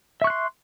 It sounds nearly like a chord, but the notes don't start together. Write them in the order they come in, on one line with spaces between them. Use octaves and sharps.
E5 C#6 F#6 C6